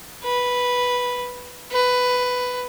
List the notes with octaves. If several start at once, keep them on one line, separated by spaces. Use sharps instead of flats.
B4
B4